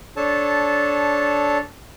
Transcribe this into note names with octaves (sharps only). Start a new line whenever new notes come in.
D4 A4 C#5 A5